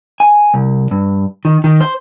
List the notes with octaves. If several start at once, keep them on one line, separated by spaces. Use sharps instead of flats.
G#5
C2
G2
D#3
D#3
C5